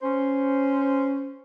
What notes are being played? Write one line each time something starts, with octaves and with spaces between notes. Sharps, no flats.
C#4 C5